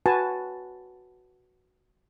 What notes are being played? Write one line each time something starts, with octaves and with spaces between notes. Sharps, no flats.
F#4 B4 G#5 A5